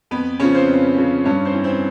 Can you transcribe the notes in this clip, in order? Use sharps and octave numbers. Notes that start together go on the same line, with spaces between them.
F2 B3 B4
C#3 F3 C#4 C#5
C4 C5
F2
C#3 F3
G2 C#4 C#5
C4 C5
E3
C4 C5